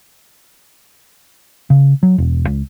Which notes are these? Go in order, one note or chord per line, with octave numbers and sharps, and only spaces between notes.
C#3
F#3
E1
C#2